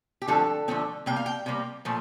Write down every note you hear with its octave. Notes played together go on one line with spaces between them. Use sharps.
G4
D3 F3 A3 C4 A4
D3 F3 A3 C4
C3 G3 A#3 G5
F5
G5
C3 G3 A#3
A#2 F3 A3